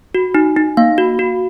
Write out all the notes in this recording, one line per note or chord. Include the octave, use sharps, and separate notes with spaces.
F#4
D#4
D#4
A#3 F5
F#4
F#4